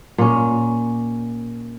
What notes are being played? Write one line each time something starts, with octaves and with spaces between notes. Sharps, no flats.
A#2 C#4